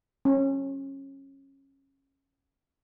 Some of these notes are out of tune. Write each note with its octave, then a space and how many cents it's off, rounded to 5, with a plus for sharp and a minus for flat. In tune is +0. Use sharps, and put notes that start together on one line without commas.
C#4 -20